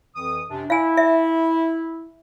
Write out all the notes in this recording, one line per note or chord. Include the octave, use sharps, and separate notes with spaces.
F2 E3 D#6
F#2 C3 D4
E4 F5 G#5
E5